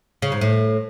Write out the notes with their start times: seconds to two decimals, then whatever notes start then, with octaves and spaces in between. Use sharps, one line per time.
0.22 C#3
0.32 G#2
0.41 A2